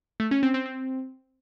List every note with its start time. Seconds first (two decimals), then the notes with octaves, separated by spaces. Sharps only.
0.20 A3
0.31 C#4
0.43 C4
0.54 C4
0.66 C4